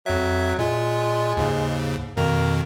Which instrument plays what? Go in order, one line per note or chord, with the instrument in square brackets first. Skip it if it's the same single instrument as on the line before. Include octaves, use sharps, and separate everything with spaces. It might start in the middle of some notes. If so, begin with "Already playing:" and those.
[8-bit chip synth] F2 E5 [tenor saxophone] F#3
[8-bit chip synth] A#2 F4 [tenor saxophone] G#3
[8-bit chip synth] D#2 G#2 C#3
[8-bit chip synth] F2 B2 D#3 [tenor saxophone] A#3